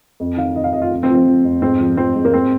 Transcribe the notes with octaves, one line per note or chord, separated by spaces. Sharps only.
F2
D#3 F5
D#3 D#5
F5
F2 D#5
F4
F2
C4
F3
C4
F3
F2
G#2 C4
F3
F3 C4
G#2
A#3
G#2 C4